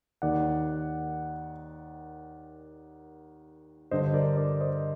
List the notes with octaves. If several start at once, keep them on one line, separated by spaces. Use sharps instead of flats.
D#2 D#3 D5 F#5
G2 D3 C5 D#5
C5
A#4 D5
A#4 D5
C5 D#5